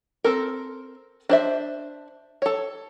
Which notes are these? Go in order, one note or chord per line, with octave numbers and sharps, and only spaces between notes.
C4 A4 A#4
D4 C5 E5
A4 C#5